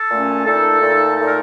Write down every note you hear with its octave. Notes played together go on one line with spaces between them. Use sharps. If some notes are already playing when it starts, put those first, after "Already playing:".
Already playing: A4
A#2 A3 C#4
A#2 A3 D#4 A4
A#2 A3 D#4
A#2 A3 D#4 A4
A#4